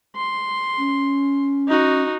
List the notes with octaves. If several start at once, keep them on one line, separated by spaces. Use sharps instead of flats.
C6
C#4
D#4 F#4